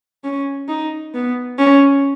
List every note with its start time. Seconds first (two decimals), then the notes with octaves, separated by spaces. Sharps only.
0.24 C#4
0.69 D#4
1.14 B3
1.59 C#4